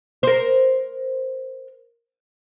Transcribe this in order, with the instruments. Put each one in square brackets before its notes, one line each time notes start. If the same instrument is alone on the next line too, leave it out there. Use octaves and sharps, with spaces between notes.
[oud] A#4 C5